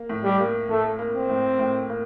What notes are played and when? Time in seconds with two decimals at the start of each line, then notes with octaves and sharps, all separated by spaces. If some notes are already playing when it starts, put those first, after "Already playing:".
Already playing: A#3
0.09 A2
0.24 G3
0.40 A#3
0.69 A2 A3
0.99 A#3
1.14 C4
1.29 A2
1.59 A2
1.90 A#3